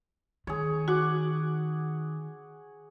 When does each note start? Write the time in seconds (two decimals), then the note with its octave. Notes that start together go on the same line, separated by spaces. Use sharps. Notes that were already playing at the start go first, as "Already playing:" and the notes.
0.47 D#3 G#4 C#5
0.88 F#4 F#5 C#6 D6